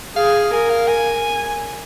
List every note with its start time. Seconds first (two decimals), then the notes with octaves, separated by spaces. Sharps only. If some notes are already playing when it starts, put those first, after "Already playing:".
0.16 G#4 F5
0.52 A#4 G#5
0.70 F5
0.88 G#5